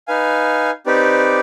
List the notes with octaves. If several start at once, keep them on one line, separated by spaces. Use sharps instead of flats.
D#4 B4 F5 G#5
C4 D#4 G4 B4 D5